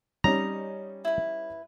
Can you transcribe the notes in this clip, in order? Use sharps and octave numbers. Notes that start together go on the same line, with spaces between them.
G3 C#4 D#4 D#5 A#5
E4 B4